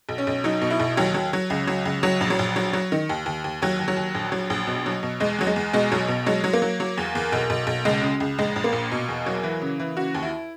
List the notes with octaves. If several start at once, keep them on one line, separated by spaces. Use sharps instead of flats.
B1
C#4
B1
F#3 D#4
B2
E4
B1
D#2 F#3
F#3
F#3
C#2
F#3
C#2
F#3
A#1
F#3
A#1
F#3
F#3
D#3
D#2
D#2
D#2
D#2 F#3
D#2
F#3
D#2
A#1
F#3
A#1
B2
F#3
B2
E2 G#3
E2 F#3
G#3
E2
B2 G#3
B1 F#3
B2
F#3 G#3
F#3
A#3
F#3
F#3
E2
E2
B1
B1
B1
C#2 G#3
C#3
C#2
A#1 G#3
A#1
A#3
A#2
B2
E2
F#3
E3
C#3
E3
C#3 F#4
D#2
E4